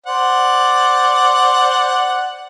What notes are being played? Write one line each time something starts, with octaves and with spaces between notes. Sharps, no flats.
C5 D5 F#5